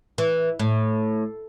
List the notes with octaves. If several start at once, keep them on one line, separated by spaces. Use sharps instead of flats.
E3
A2